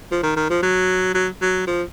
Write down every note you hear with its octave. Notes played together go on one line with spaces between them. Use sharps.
F3
D#3
D#3
F3
F#3
F#3
F#3
F3